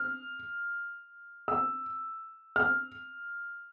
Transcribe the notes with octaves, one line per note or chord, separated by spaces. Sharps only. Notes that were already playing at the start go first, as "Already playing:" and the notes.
Already playing: F6
E6
F6